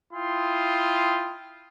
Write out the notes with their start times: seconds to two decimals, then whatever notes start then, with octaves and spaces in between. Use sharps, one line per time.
0.13 E4 F4 G5 C6 D#6